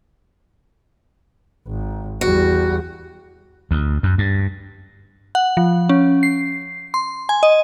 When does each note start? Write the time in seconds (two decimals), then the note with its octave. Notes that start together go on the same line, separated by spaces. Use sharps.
1.67 G#1
2.21 E2 G3 F#4
3.71 D2
4.03 F#2
4.18 G2
5.35 F#5
5.57 F3
5.89 C#4
6.23 C7
6.94 C6
7.29 G#5
7.43 D#5